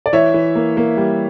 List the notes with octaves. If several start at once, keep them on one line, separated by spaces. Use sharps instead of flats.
D5
E3 C#5 E5
E3
A#3
A#3
G3